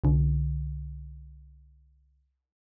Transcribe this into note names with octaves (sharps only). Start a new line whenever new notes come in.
C2 D3